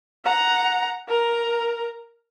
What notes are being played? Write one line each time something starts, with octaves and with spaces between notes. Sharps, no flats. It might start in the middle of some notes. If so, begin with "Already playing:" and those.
F#5 A#5
A#4 A#5